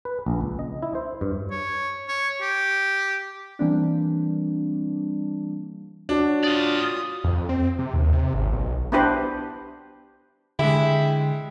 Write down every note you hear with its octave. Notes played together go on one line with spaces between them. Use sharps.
B4
A#1
C#2
D#5
E4
C5
G2
C#5
C#5
G4
E3 G3 A#3 C4 D4
D4 F#4 C#5
F4 D5 F5 D#6
F2
C4
C3
D#2
C3
G#1
B1
B3 D4 E4 G4 B4 C5
D3 G#3 E4 G4 E5